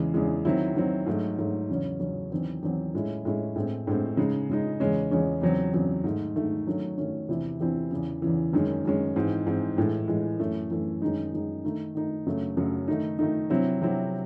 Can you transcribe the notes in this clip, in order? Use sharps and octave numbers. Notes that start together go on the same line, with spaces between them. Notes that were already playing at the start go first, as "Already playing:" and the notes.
Already playing: E2 C#3 E3 G#3
E2 C#3 E3 G#3
D#3 F#3 C4 E4
D#3 F#3 C4 E4
G#2 F#3 A3
G#2 F#3 A3
E2 C#3 F#3 C#4
E2 C#3 F#3 C#4
E2 D#3 F#3 C4
E2 D#3 F#3 C4
A2 G#3 C#4 E4
A2 G#3 C#4 E4
A2 G#3 C4
A2 G#3 C4
C#3 G#3 D#4
C#3 G#3 D#4
E2 C#3 G#3 C#4
E2 C#3 G#3 C#4
E2 C#3 F#3 C4
E2 C#3 F#3 C4
G#2 D#3 A3
G#2 D#3 A3
D#3 F#3 A3 C#4
D#3 F#3 A3 C#4
E2 C3 E3 C4 E4
E2 C3 E3 C4 E4
E2 C#3 E3
E2 C#3 E3
F#2 D#3 G#3 C#4
F#2 D#3 G#3 C#4
G#2 E3 C4
G#2 E3 C4
A2 E3 G#3
A2 E3 G#3
F#2 E3 A3
F#2 E3 A3
F#2 D#3 G#3 D#4
F#2 D#3 G#3 D#4
D#3 A3 D#4
D#3 A3 D#4
F#2 C#3 F#3 A3
F#2 C#3 F#3 A3
D#3 A3 D#4
D#3 A3 D#4
C3 F#3 C4 E4
C3 F#3 C4 E4